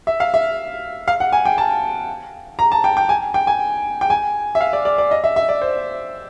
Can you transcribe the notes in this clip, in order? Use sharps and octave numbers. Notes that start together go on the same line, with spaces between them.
E5
F5
E5
F5
F#5
G#5
G5
A5
A#5
A5
G5
G5
G#5
G5
G#5
G5
G#5
E5
F5
D5
D5
D5
D#5
E5
E5
D5
C5